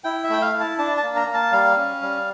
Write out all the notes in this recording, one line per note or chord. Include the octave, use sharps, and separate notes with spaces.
E4 G5
E5
A3 G5
F5
E4
A5
D4 A5
A5
A#3
A#5
A#3
A5
G3 F5
C#4
G3